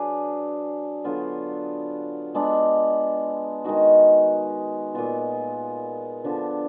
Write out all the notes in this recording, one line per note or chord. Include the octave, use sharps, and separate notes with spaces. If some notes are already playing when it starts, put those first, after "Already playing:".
Already playing: F#3 D4 G#4 B4
D3 F#3 B3 F4
G#3 B3 D4
D#3 G#3 D#4 F#4
A#2 G#3 B3 F4
D3 F3 B3 D4